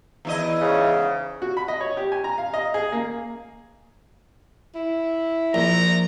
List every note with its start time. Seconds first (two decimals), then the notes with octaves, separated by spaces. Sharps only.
0.25 E2 E4 D#5
0.61 G#2 C#3
1.42 F#4
1.57 B5
1.68 D#5
1.81 C#5
1.97 G4
2.12 G#5
2.24 A#5
2.38 F5
2.54 D#5
2.74 G#4
2.92 A#3
4.75 E4
5.54 A#1 A#5